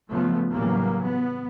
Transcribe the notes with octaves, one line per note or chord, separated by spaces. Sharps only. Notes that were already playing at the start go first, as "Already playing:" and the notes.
C#3 F3 F#3 A3 B3
A2 C#3 E3 F#3 G3 A#3
B3